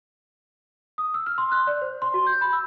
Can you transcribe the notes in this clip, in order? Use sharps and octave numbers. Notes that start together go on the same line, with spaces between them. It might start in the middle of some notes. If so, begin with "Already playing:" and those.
D#6
E6
F6
C6
F#6
D5
C5
C6
F#4
G6
B5
E6